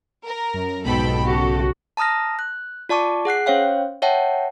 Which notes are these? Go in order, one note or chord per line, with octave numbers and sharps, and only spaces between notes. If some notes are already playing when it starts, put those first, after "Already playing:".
A#4
F#2
B1 F2 G#2 B2 A4 G5 B5
C#3 F#4 G4 A4
A5 A#5 D#6 F6 A#6
F#6
F4 D5 A5 C#6 D6
G#4 F#5 F#6 C7
C#4 C5 C#5 F5 G5
C#5 E5 F#5 G5 A5